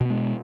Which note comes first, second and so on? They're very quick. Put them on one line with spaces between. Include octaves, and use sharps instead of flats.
B2 B3 G#3